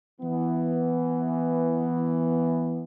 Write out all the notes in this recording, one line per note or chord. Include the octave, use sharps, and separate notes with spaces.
E3 B3